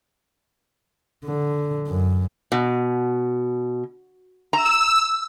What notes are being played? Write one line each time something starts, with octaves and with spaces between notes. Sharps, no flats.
D3
F#2
B2
A#5 E6